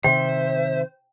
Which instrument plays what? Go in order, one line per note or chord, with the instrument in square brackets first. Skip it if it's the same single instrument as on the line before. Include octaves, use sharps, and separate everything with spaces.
[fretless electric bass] C3 D#3 [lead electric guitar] C5 [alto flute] E5 [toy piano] G5